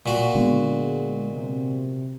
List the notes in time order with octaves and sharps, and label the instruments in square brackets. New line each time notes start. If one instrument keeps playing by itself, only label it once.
[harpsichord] A#2 F#4
[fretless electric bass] D3 B3 [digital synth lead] G#3
[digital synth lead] C3